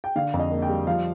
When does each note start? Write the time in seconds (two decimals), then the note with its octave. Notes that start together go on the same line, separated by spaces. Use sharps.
0.04 G5
0.16 D3 F5
0.34 F2
0.39 D#5
0.51 A#3
0.62 G5
0.68 G3
0.87 F3 F5